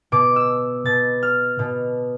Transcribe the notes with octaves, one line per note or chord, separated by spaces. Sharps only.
B2 D6
E6
B2 A6
F6
B2